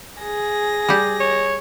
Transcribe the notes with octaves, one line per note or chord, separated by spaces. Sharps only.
G#4 A#6
G3 G4
C#5